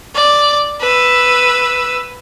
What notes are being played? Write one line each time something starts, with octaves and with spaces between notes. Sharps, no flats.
D5
B4 E6